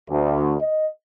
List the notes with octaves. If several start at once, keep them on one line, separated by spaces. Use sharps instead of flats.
D2
D#5